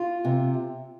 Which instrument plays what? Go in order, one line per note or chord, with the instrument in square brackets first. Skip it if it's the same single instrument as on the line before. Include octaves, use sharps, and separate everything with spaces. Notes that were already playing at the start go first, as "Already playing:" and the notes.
Already playing: [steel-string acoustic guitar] F4
C3